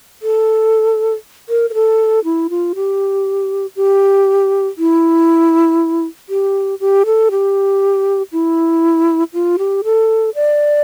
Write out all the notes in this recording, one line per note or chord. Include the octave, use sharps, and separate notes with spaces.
A4
A#4
A#4
A4
E4
F4
G4
G4
E4
G4
G4
A4
G4
E4
F4
G4
A4
D5